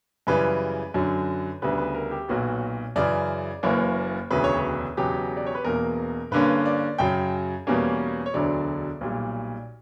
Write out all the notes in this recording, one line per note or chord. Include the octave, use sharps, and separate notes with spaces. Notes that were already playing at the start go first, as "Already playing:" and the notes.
F#2 C#3 E3 G3 B4
F#2 D3 F#3
D2 C#3 G3 B3 B4
B4
A#4
G4
B1 A#2 F#3 B3 F#4
F#2 C#3 E3 D5
F#1 F#2 E3 A#3 C#5
E1 D2 C#3 F#3 B4
C#5
B4
E1 E2 C#3 F#3 G4
D5
C#5
B4
E1 E2 B2 A#3 A#4
G2 D3 A#3 C#4 B4
D5
F#2 C#3 F#3 G5
E2 B2 G3 A#3 C#4
C#5
E1 D2 D3 F#3 D5
B1 A#2 G3